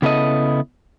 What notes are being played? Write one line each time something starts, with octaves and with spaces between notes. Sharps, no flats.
C#3 B3 E4 A4 D#5